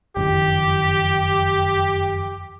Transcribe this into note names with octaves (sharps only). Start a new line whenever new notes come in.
F#1 F2 D#3 G4